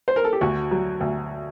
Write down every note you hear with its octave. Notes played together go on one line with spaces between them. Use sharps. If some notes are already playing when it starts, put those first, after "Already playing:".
C5
A#4
A4
G4
D2 F#4
F#3
D2